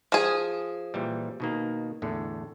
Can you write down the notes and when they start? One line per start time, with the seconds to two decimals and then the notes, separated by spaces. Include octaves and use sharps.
0.12 F3 G#4
0.94 A#2 E3 G3
1.40 B2 D#3 A#3
2.02 E2 A2 D3